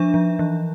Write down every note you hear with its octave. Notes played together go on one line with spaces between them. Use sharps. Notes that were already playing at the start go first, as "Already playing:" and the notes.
Already playing: F3 D4 E5
F3
E3